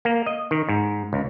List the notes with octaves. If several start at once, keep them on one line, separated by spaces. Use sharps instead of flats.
A#3
D#5
D#3
G#2
C#2